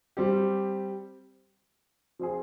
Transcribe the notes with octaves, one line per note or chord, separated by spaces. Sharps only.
G3 C4 G4
F3 C4 F4 G#4